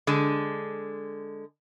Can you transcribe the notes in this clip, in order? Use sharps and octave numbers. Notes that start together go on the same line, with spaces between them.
D3 G#3